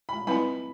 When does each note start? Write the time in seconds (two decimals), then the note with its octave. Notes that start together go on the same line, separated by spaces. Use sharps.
0.09 B5
0.27 G3 C4 E4 B4 F5 B5